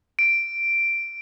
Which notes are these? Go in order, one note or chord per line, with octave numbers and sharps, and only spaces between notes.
D7